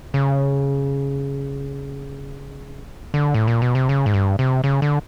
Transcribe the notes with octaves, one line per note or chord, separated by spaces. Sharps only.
C#3
D3
A2
A#2
B2
C3
C#3
G#2
G2
C3
C#3
D3